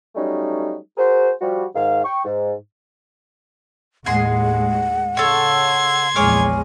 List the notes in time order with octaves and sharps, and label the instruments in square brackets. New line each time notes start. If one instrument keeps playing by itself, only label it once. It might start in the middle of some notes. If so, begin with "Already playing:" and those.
[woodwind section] F#3 G3 A3 C#4 D#4
F#4 G#4 A#4 C5
F3 G3 F#4
G#2 D#3 F5
G5 C#6
G#2
[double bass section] D#2 A2 G#3 [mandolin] G#4 C6 [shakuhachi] F#5
[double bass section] C#3 [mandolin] A4 C#5 [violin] C6 G#6
[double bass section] A#1 E2 G#3 [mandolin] C#5 D6 F6 [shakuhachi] G#5